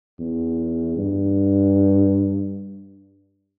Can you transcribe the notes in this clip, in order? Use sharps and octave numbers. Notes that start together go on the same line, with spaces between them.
E2
G2